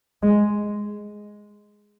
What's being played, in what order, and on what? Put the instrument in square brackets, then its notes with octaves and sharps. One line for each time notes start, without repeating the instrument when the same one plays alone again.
[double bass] G#3